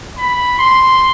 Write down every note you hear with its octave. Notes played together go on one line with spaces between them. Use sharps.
B5
C6